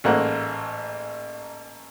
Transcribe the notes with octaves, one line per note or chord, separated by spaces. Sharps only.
A1 G#2 A3 A#3 F#5